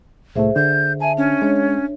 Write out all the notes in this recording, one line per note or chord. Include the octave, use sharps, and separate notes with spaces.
C2 A2 A3 G#4 C5 E5
D3 G6
E5 G#5 A5
C#4 D4
G#3 D4 C#5